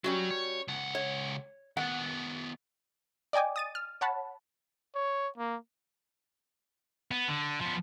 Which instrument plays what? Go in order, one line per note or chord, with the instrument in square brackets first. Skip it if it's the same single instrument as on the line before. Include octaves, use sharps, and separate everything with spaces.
[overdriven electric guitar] F#3 [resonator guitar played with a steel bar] G3 C#4 F#4
[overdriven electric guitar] C#5
C#2 F#5
[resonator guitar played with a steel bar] C#5
[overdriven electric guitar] D#3 B3 [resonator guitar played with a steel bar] F#5
[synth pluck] D5 D#5 G5 G#5 D6
D#6 A6 D#7
F6
C#5 F#5 A5 B5
[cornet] C#5
A#3
[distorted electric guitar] B3
D3
F3 B3